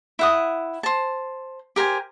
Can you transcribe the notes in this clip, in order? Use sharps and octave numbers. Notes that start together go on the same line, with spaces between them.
E4 F#5 D#6
C5 A5
G4 A#4 C5 G#5